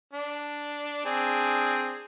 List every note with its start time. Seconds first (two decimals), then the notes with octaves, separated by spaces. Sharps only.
0.13 D4
1.05 C4 D4 G#4